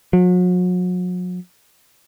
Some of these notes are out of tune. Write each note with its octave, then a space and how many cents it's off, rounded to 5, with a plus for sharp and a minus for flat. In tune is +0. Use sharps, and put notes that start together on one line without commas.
F#3 -40